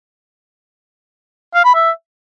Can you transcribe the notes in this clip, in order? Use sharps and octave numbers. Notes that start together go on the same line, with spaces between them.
F5
B5
E5